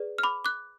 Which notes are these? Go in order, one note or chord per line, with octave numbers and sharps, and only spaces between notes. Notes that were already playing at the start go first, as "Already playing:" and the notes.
Already playing: G#4 B4 D5
F6
B5 D6
D6 F#6